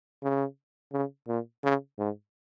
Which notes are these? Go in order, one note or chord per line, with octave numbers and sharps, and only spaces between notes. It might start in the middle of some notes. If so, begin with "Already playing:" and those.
C#3
C#3
A#2
C#3
G#2